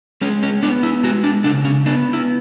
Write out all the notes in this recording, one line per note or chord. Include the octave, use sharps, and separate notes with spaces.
G#3 C#4
C#4
B3 D4
E4
G#3 F#4
D4
C#3 D4
C#4
B3 D4
E4